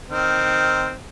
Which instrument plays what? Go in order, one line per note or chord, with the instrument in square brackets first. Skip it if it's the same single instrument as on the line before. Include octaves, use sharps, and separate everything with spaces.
[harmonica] D#3 C4